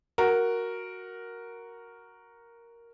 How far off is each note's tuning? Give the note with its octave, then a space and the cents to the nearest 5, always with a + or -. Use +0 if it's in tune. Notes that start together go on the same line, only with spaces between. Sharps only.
F#4 +0 A#4 +0